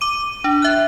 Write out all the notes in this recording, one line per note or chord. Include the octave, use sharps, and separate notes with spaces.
D6 D#7
D4
E5 F#6